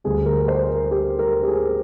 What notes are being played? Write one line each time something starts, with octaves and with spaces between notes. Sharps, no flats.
D2 D3 G3 G#4
A#4
C5
A#4
G4
A#4
G4
G#4